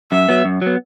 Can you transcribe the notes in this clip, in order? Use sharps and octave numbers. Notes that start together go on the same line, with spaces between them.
F#2 E5
F#3 B3
F#2
F#3 B3